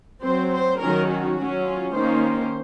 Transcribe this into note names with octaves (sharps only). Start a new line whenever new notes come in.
F#3 C4 C5
C5
D#3 F#3 C#4 A#4
F#4
F#3 C#4
F4
D#3 A#3 C#4 C5